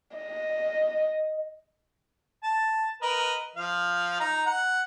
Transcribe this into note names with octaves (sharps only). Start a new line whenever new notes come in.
D#5
A5
A#4 B4 D#5
F3 F5
D#4 A#5
F#5